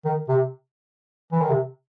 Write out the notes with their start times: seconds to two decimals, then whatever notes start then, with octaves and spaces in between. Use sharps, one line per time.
0.05 D#3
0.29 C3
1.32 E3
1.41 D#3
1.50 C3